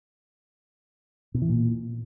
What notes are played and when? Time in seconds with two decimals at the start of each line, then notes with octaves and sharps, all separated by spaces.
1.34 B2
1.42 E3
1.49 A#2